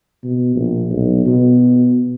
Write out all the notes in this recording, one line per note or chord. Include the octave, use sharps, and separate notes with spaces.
B2
A#1
B1
B2